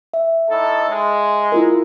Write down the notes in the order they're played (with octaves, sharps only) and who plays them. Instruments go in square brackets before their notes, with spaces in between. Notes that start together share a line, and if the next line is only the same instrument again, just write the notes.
[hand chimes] E5
[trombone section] A2 D#4 A4
G#3
[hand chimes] E4 F4 A#4